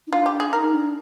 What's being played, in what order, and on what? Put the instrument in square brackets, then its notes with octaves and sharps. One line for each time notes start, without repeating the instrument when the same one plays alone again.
[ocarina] D#4
[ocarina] D4 [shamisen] F4
[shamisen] G4
G#4
[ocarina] D#4 [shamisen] A#4
[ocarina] D4